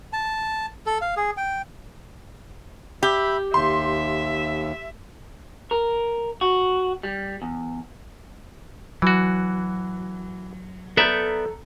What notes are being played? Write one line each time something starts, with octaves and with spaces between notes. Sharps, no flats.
A5
A4
F5
G#4
G5
G4 E5 B5
D#2 E5 C6
A#4
F#4
G3
E2
E3 F#3 F#4
B3 A4 D5 E5 A#5 G6